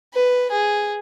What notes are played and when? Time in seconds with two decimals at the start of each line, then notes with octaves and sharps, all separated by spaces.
0.14 B4
0.51 G#4